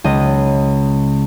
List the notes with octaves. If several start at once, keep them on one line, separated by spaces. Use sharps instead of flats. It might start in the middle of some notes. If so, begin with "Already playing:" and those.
C#2 D#5